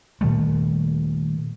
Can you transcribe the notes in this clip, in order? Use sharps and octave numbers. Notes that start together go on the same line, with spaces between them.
A#2 D#3 G3 A3